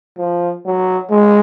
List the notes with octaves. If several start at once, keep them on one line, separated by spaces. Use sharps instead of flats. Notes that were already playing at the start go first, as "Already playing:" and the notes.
F3
F#3
G#3